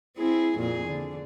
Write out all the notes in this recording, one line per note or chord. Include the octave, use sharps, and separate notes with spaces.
C4 E4 G#4
F2 A#2 G#4
D3